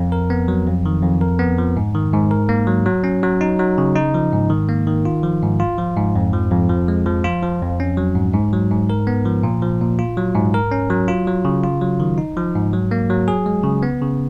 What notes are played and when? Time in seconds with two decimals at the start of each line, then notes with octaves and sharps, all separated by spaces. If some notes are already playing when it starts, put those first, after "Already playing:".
Already playing: F2
0.12 A#4
0.30 B3
0.48 F#3
0.67 F2
0.86 D#3
1.03 F2
1.21 A#4
1.39 B3
1.58 F3
1.77 G#2
1.94 D#3
2.13 G#2
2.31 A#4
2.49 A#3
2.67 F#3
2.86 F#3
3.04 C#4
3.23 F#3
3.41 D#4
3.59 F#3
3.78 C#3
3.95 D#4
4.14 F3
4.32 G#2
4.50 D#3
4.69 A#3
4.87 D#3
5.05 F4
5.23 F3
5.42 G#2
5.60 F4
5.78 F3
5.97 G#2
6.16 F2
6.33 F3
6.51 F2
6.69 F3
6.88 G#3
7.06 F3
7.24 F4
7.43 F3
7.62 F2
7.80 C#4
7.97 F#3
8.15 G#2
8.34 G#2
8.53 F#3
8.71 G#2
8.90 A#4
9.07 B3
9.26 F3
9.43 A#2
9.62 F3
9.81 A#2
9.99 F4
10.17 F#3
10.35 G#2
10.54 A#4
10.71 C#4
10.90 F#3
11.08 F4
11.27 F#3
11.45 C#3
11.63 F4
11.81 F#3
12.00 D#3
12.18 D#4
12.37 F3
12.55 G#2
12.73 F#3
12.91 A#3
13.10 F#3
13.28 G#4
13.46 G#3
13.64 C#3
13.83 B3
14.01 C#3